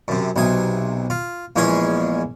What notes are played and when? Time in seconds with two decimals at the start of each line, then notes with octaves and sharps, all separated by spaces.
0.08 F#2 C3
0.36 B1 C3 G#5 D#6
1.10 F4
1.56 A#1 E2 G#3 C#4 G#4 G#5